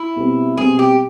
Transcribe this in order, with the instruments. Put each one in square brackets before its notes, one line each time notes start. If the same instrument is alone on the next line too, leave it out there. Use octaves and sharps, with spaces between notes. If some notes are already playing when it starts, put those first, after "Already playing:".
Already playing: [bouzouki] E4
[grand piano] B2 G3 C4
[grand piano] B2 G3 C4 [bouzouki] G#4
[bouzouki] G4